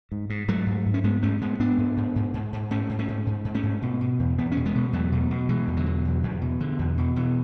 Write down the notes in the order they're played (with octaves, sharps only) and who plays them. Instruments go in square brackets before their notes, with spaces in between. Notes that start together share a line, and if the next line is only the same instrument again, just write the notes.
[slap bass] G#2
G#2
G#2 F#3 A3
G#2
G#2
C#4
G#2 G#3 B3
G#2 A3 C#4
G#2 G#3 B3
G#2 B3 D4
G#2
G#2
G#2
G#2
G#2
G#2 A3 C#4
G#2
A3 C#4
G#2
G#2
G#2
A3 C#4
G#2
B2
B2
E2
E2 B3
C#4
B2
G#3 B3
B2
E2 F#3 A3
B2
B2
B2 E3 G#3
E2
D3 F#3
B2
E2
E2
B2
B2 D3
E2
B2
B2 E3